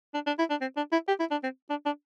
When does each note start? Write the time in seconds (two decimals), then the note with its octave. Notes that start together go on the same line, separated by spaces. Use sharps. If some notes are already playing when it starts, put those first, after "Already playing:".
0.14 D4
0.27 D4
0.39 E4
0.50 D4
0.61 C4
0.77 D4
0.92 E4
1.08 G4
1.20 E4
1.31 D4
1.43 C4
1.70 D4
1.86 D4